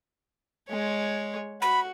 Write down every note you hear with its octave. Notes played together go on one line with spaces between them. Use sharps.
G#3 C#5
F#4 B5